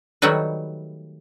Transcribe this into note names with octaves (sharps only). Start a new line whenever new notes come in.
D#3 F#3 G3 A3 F#4 B4